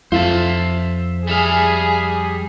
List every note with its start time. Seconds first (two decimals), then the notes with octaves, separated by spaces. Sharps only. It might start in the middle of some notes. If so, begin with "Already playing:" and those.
0.12 F2 F4 C5 E5 A5
1.27 G3 G#4 E5 F5